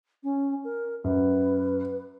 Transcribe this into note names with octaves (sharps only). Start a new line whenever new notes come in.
C#4
A#4
F#2 B4